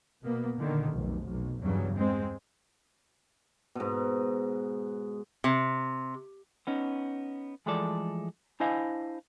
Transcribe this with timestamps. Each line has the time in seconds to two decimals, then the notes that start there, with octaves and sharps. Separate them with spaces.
0.23 B2 A#3 B3
0.56 A#2 D3 D#3
0.91 F1 B1
1.25 B1
1.61 E2 G2 C#3 F#3
1.97 G#3 C4
3.75 G#2 B2
5.44 C3
6.67 B3 C#4 D#4
7.66 E3 F3 G#3 A3 A4 D5
8.60 D4 E4 C5 D#5 F5 G#5